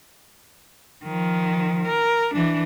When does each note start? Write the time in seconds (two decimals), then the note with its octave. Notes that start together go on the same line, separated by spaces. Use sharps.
1.05 D#3 F3
1.86 A#4
2.34 E3 D4